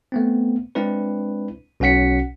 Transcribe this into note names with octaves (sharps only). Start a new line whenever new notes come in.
A3 B3 C4
G#3 C4 D4 E4 B4
B1 C#4 F#4 F#5 B6 C#7